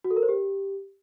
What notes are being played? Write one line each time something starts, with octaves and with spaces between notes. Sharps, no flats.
F#4
A4
A#4
C5
G4